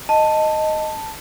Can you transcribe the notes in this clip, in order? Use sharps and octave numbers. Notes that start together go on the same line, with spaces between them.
D#5 A5